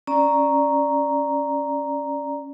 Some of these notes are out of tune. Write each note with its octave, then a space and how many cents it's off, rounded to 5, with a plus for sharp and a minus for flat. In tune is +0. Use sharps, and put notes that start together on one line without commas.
C#4 +0 D5 +0 A#5 +0